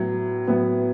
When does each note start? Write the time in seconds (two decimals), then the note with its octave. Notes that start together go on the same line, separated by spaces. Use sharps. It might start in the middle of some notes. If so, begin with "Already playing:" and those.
Already playing: A2 F#3 B3
0.48 A2 F#3 B3